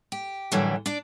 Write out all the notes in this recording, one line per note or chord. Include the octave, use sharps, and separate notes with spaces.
G4
F#2 A2 D3 E3 F#3 G3
D4 D5